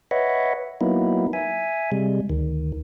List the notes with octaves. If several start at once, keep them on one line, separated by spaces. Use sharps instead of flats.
B4 C#5 D#5 E5 F#5
F#3 A#3 B3 D#4 E4
E5 G#5
C3 G3 G#3
D2 D#3